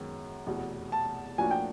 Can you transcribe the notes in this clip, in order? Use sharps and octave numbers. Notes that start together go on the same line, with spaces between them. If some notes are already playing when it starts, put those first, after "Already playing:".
Already playing: F#2 D#3 G#3 B3
F1 E2 B2
A5
A2 F3 A#3 D4 F#4 G#5
G5